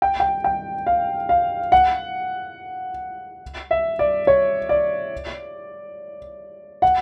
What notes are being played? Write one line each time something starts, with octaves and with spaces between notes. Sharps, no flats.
G5
G5
G5
F5
F5
F#5
E5
D5
C#5
D5
F#5